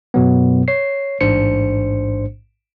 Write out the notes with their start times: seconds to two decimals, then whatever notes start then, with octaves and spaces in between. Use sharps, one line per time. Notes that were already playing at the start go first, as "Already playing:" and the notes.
0.14 F#2 B2 F#3 B3
0.68 C#5 C7
1.21 A1 G#2 D4 C5 C#7